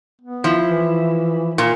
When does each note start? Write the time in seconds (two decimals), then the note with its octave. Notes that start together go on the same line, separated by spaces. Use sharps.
0.21 B3
0.44 F3 E4
0.70 E3
1.58 A#2